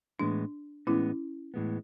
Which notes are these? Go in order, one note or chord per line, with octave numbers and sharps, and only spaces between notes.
A2 E3 G#3 B3 D4
A2 E3 G#3 B3 C#4 E4
A2 E3 G#3 B3